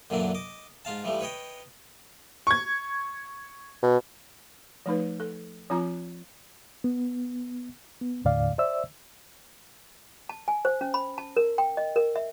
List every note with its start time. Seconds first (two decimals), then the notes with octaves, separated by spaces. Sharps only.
0.10 F#2 A#2 D3 E3 F#3 D4
0.35 D#5 D6
0.85 G#2 F4 F5 A5
1.04 E3 F3 G3 A3
1.21 B4 C#5 D#5 G5
2.47 C#6 G#6
3.82 B2
4.86 F3 A3 D#4 B4
5.20 A4
5.70 F3 C4 F4 A#5
6.84 B3
8.02 B3
8.25 D#2 A2 D3 D5 F5
8.58 C5 D5 E5 E6
10.29 A5
10.48 G#5
10.65 C5
10.81 C#4
10.94 B5
11.18 A5
11.37 A#4
11.58 G5
11.77 D#5
11.96 A#4
12.16 E5